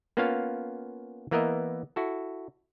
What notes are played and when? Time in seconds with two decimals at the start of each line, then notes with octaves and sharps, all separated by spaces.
0.17 A#3 B3 C#4 F4 C#5 F5
1.31 E3 A#3 B3 A#4 D#5 E5
1.96 E4 F#4 A4